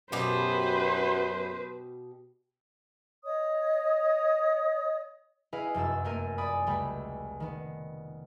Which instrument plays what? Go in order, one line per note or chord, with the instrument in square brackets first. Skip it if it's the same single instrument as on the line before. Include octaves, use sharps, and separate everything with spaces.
[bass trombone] F#2 [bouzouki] B2 G4 [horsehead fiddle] B4 C5
[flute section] C#5 D#5 D#6
[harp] E4 G#4 B4 D#5 F5
F1 F#2 A5 E6
A3 A#3 A#4 D#7
D5 G#5 B5 D#6
C#2 G3 A3 B5
D#3 B3